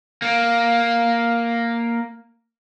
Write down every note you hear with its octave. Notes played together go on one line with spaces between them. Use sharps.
A#3